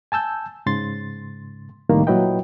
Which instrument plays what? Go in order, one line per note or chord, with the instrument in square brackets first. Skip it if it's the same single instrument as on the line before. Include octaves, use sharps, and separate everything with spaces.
[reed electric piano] G#5 A5 E6 G6
G#2 C#3 C6 A6
C2 A2 D#3 G3 A#3
A#2 F#3 E4 B4 D#5 G5